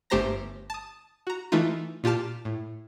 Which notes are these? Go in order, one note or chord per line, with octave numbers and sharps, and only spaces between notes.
G1 A3 G4 C5 A#5 A#6
A5 D#6
F#4 A#5
E3 A3 D#4 F4
A#2 F4 G4 A5 F6
A2